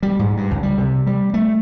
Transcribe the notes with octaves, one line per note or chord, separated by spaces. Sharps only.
G3
G#2
G2
C#2
G3
C3
G3
A3